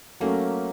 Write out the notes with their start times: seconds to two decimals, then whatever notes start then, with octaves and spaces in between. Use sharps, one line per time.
0.20 F#3 A3 A#3 C#4